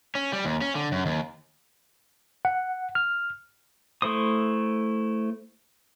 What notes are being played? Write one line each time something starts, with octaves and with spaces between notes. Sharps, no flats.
C#4
G3
D#2
C#4
D3
F#2
D#2
F#5
F6
A3 E4 C5 D#6